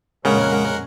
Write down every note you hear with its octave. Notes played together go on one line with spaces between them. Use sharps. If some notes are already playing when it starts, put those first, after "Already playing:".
F2 A#2 C#3 G#3 C#4 A#4 F#5